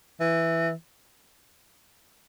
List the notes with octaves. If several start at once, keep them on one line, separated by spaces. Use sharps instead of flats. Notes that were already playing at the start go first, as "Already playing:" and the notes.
E3